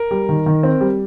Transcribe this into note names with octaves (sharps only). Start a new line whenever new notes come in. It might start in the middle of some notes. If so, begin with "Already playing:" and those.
Already playing: A#4
G3
D#3
D#3
C4
G3